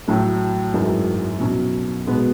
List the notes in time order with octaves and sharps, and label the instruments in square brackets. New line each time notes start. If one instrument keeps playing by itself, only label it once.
[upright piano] A2 F#3 A3
G#1 F#2 E3 G#3
B2 F#3 C#4
B2 G#3 B3